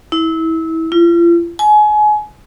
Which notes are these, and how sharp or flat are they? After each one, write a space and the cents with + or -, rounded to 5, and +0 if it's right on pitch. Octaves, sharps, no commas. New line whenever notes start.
E4 -25
F4 -40
G#5 +30